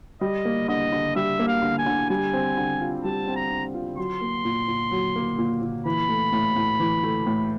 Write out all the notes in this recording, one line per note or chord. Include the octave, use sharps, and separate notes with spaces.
G3 D#5
A#3
D3 D#5
D3
G3 E5
A#3
F5
D3
G#5
D3
G3 G#5
C4
D3
F4
G3 A5
C4
A#5
D3
F4
F#3 C6
A#3
A#2
A#2
F#3
A#3
A#2
A#2
E3 B5
A3
A2
A2
E3
A3
A2